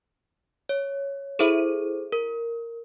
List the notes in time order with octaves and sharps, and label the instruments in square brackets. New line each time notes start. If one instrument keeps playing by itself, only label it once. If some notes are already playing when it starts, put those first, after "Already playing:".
[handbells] C#5
[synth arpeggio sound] E4 D#7 [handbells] G#4 A4 C5
[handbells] A#4